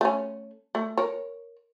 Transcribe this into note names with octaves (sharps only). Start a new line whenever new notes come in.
A3 C#4
A3
A#4 C#5